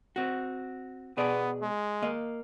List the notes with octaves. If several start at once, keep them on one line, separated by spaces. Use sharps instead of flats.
C4 F#4
B2 B3 G#4 D5
G#3
A#3 D#5